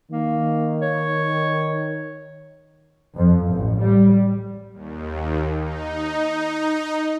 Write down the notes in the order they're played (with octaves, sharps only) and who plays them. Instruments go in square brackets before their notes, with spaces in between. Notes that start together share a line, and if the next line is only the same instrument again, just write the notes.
[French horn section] D#3 [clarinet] A#3
[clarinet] C#5
[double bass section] F2
A1
G3
[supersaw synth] D#2
D#4